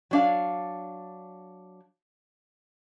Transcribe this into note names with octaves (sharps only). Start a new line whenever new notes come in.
F#3 D4 F5